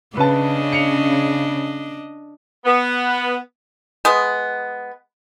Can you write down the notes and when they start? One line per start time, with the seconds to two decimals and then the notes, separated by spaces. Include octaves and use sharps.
0.17 C#3 D4 B4 D#5 A5
0.72 C#7 F7
2.65 B3
4.05 G#3 B3